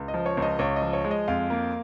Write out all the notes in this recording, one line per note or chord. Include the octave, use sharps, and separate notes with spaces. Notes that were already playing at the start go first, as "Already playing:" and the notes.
Already playing: C#2
D#5
F3
C#5
C#2 D#5
C#2 C#5
D#5
F3
C#5
G#3
D#5
F2 F5
A#3